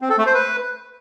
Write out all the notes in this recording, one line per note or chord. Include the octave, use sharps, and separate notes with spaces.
C4
A4
A3
C5
B4